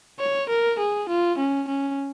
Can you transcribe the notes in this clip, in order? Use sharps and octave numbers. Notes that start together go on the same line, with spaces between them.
C#5
A#4
G#4
F4
C#4
C#4